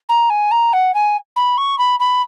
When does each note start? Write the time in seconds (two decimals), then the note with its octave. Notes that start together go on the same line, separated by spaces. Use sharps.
0.09 A#5
0.30 G#5
0.51 A#5
0.73 F#5
0.94 G#5
1.36 B5
1.58 C#6
1.78 B5
2.00 B5